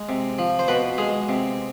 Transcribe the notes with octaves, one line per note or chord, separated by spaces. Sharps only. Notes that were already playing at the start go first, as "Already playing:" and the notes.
Already playing: G#3
C3
F3
C5
B2 B4
G#3 G#4
C3